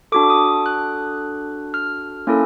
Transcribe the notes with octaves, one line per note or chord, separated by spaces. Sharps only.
D4 F#4 A4 D6
D#6
F#6
F6
A#3 C#4 E4 A4